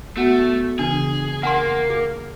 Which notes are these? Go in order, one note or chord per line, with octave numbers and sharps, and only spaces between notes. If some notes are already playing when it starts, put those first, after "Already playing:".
A3 B3 F#4 F#5
C#3 E3 D4 G#4
A#3 F#5 G#5 C6
G#4